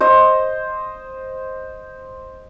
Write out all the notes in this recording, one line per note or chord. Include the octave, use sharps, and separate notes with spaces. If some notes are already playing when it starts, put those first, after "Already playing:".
C5 D#5